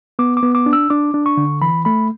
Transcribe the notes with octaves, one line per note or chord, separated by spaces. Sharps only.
B3 D6
D6
B3
D6
D4
E6
D4 D6
D4
C#6
D3
E3 B5
A3 B5